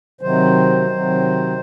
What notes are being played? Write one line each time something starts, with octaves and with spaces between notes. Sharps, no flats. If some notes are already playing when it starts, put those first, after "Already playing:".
C3 D#3 F#3 C5
C3 D#3 F#3